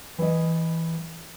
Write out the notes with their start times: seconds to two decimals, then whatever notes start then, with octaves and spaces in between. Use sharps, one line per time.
0.18 E3 D#5